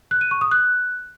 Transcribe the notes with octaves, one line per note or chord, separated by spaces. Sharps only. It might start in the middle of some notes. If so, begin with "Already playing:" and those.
F#6
D#7
C#6
D#6
F#6